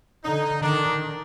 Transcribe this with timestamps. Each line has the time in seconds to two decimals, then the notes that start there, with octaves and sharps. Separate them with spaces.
0.25 D3 D#4
0.62 D#3 D4